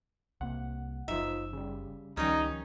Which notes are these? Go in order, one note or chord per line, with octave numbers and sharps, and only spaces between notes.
C2 A#3 F#5
F#1 F3 D#4 E5
C#3 G3
C#2 D#3 F3 G3 C#4 D#4